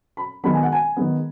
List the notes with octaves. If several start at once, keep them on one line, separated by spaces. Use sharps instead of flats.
B5
D#3 G#3 B3 B5
G#5
F#5
G#5
D#3 G#3 B3